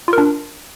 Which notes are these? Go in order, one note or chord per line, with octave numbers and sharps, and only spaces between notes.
D4 F4 A#4